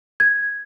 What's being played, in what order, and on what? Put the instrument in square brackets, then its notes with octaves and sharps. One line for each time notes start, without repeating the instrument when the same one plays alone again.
[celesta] G#6